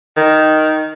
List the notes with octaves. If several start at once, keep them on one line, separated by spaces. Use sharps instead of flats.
D#3